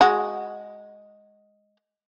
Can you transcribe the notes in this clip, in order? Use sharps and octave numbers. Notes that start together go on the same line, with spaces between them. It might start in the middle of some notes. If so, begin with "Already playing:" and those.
G#3 F#4